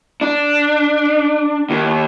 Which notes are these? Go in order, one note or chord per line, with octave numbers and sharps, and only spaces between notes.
D4
D#2